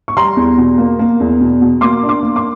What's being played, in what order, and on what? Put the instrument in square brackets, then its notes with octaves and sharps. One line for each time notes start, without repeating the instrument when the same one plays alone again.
[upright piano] C#6
G3 A#5 C6
E2
B2
A#3
A#3
E2
B2
B2
A#3 C6 D6
D4
C6 D6
A#3
C6 D6